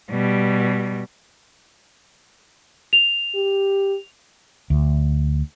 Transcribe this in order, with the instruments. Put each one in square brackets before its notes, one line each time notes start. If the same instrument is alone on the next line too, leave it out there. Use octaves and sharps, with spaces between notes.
[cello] B2 G3
[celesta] F7
[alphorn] G4
[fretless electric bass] D2